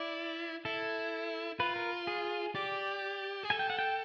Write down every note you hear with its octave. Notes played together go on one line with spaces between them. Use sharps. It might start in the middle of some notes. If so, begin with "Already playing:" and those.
Already playing: E4 D5
E4 A4
F4 B4
A#4
G#4
G4 D5
G#4
A4 G#5
G5
F#5
G5